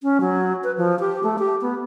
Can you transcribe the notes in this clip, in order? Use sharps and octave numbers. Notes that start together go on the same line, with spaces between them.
C#4
F#3
B4
F3
G4
A3
G4
B3